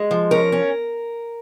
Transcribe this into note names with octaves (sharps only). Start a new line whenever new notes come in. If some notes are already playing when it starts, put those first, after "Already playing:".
Already playing: G#3
F3
C#4 A#4
C#4